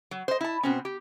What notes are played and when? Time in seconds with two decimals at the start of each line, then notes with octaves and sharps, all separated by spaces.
0.11 F#3
0.28 C5 D#5
0.41 E4 A5
0.63 B2 C4 C#4
0.85 G4